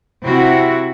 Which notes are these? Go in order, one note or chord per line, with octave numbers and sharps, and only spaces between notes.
C3 C4 E4 F#4